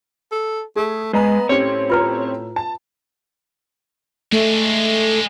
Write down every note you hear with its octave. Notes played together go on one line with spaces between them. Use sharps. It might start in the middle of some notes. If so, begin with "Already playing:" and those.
A4
A3 G#4
G#3 B3 B4 D#5 A#5
A2 C4 C#4 G4 C#5
F4 B4 A#5
A5
G#3 A3 D4